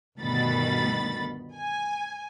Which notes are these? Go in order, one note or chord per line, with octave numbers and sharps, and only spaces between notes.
G1 D2 B2 D#3 B5 A6
G#5